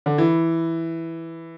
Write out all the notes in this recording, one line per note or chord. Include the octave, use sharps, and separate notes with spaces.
D3
E3